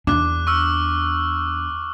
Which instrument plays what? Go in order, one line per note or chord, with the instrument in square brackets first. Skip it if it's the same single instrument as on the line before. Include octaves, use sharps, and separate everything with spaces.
[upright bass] E2 D4 [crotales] D6 F#6
[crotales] C#6 E6 F6